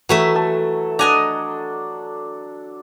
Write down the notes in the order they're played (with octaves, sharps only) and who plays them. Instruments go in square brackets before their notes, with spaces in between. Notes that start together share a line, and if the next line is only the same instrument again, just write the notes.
[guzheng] E3 A3 E5 [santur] F#3
[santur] A4
[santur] D4 F#5 [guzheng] D#5 G#5 A#5